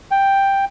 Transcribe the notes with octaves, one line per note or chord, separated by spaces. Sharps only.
G5